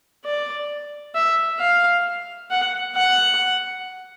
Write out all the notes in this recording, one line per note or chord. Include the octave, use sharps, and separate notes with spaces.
D5
E5
F5
F#5
F#5